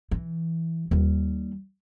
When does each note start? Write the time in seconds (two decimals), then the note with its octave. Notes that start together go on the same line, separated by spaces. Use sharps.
0.11 E3
0.91 D#2 G3